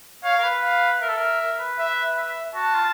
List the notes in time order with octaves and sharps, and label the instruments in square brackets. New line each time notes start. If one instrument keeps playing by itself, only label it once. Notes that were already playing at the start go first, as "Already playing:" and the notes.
[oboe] C#5 [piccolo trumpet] F5
[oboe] A#4
B4
[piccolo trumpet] F5
[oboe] A#4 [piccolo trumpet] E5
[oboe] A4
A#4
A#4
B4
[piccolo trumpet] E5
E5
[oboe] F#4 [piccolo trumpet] A5
[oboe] F4